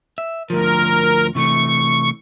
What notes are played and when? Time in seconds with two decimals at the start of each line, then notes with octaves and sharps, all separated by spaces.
0.18 E5
0.50 D2 F3 A#4
1.35 C3 E3 A3 C#6